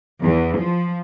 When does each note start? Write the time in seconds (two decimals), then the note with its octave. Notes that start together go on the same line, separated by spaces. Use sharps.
0.21 E2
0.57 F3